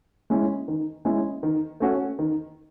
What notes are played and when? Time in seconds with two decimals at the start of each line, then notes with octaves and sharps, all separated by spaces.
0.30 G#3 C#4 E4
0.68 D#3
1.05 G#3 C#4 E4
1.43 D#3
1.80 A3 C#4 F#4
2.19 D#3